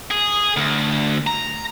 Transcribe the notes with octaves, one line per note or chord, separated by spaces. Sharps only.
G#4
D2
A#5